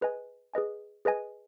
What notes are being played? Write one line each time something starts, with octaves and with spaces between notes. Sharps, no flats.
G#4 B4 D#5 G#5
G#4 B4 D#5 G#5
G#4 B4 D#5 G#5